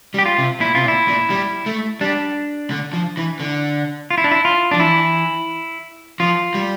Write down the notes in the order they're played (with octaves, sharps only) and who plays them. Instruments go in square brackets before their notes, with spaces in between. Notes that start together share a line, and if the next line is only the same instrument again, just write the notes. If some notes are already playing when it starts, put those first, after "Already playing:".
[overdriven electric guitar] G3
[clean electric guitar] G4
F4
[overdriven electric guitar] C3
[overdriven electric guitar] A#2 [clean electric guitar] E4
[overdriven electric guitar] C3 [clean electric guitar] F4
[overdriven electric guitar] A#2
[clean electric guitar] E4
[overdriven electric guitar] A#2
G3
A3
[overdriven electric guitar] G3 [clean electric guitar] D4
[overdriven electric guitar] D3
F3
E3
D3
[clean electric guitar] F4
E4
D4
E4
F4
[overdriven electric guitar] F3 [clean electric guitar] D4
[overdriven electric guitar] E3 [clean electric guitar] E4
[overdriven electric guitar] F3 [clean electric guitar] F4
[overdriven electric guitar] G3